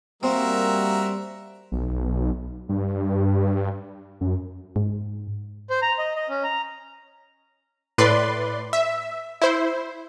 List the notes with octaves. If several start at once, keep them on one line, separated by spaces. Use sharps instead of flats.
G3 A#3 C4 F#4 A#4 E5
B1
G2
F#2
G#2
C5
A#5
D#5
D#5
C#4
A#5
A2 B4 D5 C6
E5
E4 C5